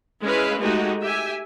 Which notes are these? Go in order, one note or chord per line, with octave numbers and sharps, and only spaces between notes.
G#3 C#4 E4 B4 F5
G#3 A3 D#4 F#4 G4
G4 E5 G#5